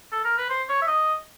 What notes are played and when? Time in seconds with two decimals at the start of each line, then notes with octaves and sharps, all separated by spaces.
0.12 A4
0.24 A#4
0.37 B4
0.49 C5
0.69 C#5
0.82 E5
0.87 D#5